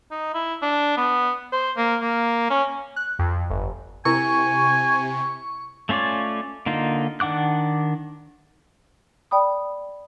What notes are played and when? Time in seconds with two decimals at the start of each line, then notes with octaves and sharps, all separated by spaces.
0.11 D#4
0.34 E4
0.62 D4
0.97 B3
1.52 C5
1.77 A#3
2.01 A#3
2.50 C#4
2.96 F#6
3.19 F2
3.50 G1
4.05 C3 E4 A#4 G#5 C#6
5.89 A3 C#4 F4 C#5 D5
6.66 D3 A#3 D#4 F4
7.20 D#3 D4 F#5 D6 F#6
9.31 D5 G5 B5 D#6